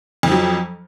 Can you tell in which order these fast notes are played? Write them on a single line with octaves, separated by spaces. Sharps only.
F2 F3 F#3